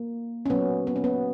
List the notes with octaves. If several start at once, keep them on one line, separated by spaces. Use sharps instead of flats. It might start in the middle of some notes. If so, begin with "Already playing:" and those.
Already playing: A#3
C#4
A#2 F#3 A#3 B3
B3
C#4
B3